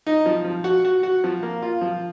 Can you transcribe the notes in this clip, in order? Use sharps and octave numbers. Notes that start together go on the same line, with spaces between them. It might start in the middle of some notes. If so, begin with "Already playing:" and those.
D#4
F3
F3
F#4
F#4
F#4
F3
A#3
F4
F3